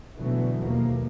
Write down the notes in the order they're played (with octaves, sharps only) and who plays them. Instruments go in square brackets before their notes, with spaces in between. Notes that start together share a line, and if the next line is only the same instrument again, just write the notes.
[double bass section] B2 D3 E3 F#3 A3 B3
D#2 B2 F3 A#3